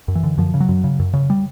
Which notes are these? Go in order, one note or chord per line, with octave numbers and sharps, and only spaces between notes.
F#2
E3
D3
F#2 F3
C#3
F#3
F#2
C#3
F#2
C#3
G3